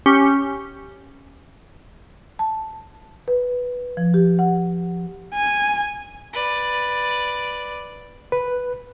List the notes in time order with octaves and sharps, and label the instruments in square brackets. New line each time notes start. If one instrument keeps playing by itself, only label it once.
[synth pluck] C#4 G4
[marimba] A5
B4
F3
G4
F#5
[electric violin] G#5
[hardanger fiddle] B4 D5
[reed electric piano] B4